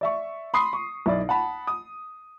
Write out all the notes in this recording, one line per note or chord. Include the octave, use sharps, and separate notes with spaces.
D5 E5 C#6
B5 C6 D#6 C7
C#6
B1 E4 D5
F#5 A5 B5
D#6